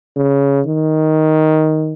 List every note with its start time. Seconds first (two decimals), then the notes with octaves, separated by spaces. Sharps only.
0.16 C#3
0.67 D#3